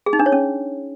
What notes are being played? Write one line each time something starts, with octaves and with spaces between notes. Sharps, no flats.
G#4
D#4
D4
C#5
C#4